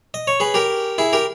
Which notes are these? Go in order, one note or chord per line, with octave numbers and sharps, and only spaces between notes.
D#5
C#5
G#4 B4
G4 A#4
E4 G#4
G4 A#4